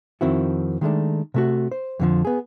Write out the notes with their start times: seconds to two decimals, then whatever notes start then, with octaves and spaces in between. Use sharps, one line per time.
0.21 F2 D#3 C4 E4 F#4
0.81 D#3 G#3 A3 D4
1.34 C3 A3 F#4
1.72 C5
1.99 F2 D3 F3
2.25 B3 G#4